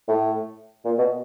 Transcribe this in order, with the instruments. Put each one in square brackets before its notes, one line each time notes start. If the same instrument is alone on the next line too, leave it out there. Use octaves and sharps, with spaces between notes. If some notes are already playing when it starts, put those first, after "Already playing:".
[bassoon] A2
A#2
B2